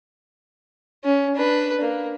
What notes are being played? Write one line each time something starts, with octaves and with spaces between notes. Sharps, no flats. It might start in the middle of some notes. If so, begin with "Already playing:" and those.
C#4
D4 B4
A#3